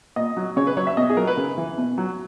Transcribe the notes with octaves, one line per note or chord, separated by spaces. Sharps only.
A#2 D#5
F#3
C#3 C#5
B4
F#3 C#5
E5
B2 D#5
G#4
F#3 A#4
B4
C#3
E3
B2
F#3